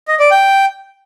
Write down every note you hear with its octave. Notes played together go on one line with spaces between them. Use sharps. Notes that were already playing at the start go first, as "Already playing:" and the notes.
D#5
D5
G5